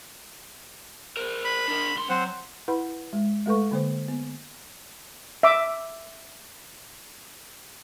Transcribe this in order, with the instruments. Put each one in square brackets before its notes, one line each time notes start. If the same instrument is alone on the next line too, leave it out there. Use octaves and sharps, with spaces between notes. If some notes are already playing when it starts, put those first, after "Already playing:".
[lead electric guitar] A#4 C5
[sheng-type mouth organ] B5
[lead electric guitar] D4 A#4
C#2 C6
[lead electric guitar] F#3 [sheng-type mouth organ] C4 C5 F#5
[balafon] E4 B4 F#5 B5
G#3
G#3 A3 A4 B4 C#6
D3 A#3 C5
B3
[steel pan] E5 D6